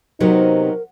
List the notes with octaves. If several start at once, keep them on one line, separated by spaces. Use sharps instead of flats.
C3 D#3 F#3 B3 D#4 A#4